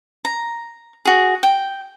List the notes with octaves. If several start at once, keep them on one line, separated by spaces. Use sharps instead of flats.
A#5
F#4 G#4
G5